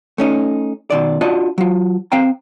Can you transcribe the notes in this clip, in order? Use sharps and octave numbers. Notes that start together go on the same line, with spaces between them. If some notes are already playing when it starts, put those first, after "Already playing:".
A3 C#4 D#4
B2 D#3 D5
D4 F4 F#4 D5 D#5
F#3 F4
C4 F5 G5 A#5